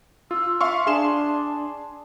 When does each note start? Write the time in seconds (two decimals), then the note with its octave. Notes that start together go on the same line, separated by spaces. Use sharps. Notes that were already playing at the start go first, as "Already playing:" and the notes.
0.31 F4 E6
0.61 E5 F5 C6 C#6
0.87 D4 G#4 C6 E7